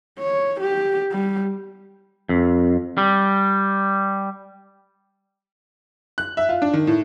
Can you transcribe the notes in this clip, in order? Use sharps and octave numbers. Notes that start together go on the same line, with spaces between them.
C#5
G4
G3
F2
G3
F#6
E5
F4
D4
D#3
A2